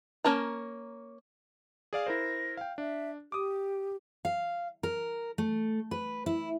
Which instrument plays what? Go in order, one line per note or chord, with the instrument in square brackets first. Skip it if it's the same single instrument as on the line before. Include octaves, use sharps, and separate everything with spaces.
[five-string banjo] A#3 C#4 A#4 A5 A#5
[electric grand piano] G#4 D5 F5
[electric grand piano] E4 A#4 C5 [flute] A#6
[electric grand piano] F5 G5
[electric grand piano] D4 [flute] E5
[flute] G4 [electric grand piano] D6 D#6
[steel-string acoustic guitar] F5
A#4
A3
B4
E4